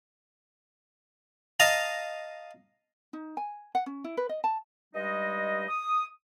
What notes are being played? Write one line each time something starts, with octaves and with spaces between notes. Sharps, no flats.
D#5 F5 A5 A#5
D#4
G#5
F#5
C#4
E4
B4
D#5
A5
G2 G3 G#3 D#4 D#5
D#6